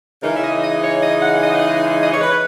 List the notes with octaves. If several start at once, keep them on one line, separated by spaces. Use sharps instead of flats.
C#3 E3 G#3 D#4 A#4
E5
D#5
D#5
C#5
D#5
F#5
D#5
D#5
C#5
B4